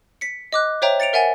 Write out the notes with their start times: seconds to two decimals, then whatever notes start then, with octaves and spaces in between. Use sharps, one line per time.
0.21 B6 C#7
0.52 D#5 D6 F#6
0.82 C5 C#5 E5 G5 A#5
1.00 A6 C#7 D7 F7
1.13 A#4 E5 F#5 G#5 A6